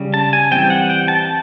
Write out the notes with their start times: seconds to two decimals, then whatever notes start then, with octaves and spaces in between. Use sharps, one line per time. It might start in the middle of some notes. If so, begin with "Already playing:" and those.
Already playing: C#3 G3
0.14 A5
0.33 G#5
0.51 E3 G3 C4 G5
0.70 F#5
0.90 G5
1.08 A5